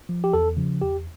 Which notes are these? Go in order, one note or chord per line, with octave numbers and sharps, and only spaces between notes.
F3
G4
E2 A4
C#3 F3
E2 G4